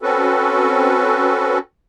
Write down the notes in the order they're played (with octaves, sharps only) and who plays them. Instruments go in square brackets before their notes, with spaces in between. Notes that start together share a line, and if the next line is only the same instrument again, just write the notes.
[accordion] C4 C#4 F#4 A4 B4